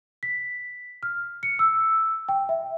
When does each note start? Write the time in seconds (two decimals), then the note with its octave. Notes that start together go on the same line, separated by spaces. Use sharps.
0.23 B6
1.03 F6
1.43 C#7
1.59 E6
2.29 G5
2.49 E5